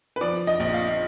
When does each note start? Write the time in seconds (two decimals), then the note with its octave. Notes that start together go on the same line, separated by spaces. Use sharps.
0.16 B4
0.21 F3 D5
0.47 D#5
0.60 A#1
0.74 F5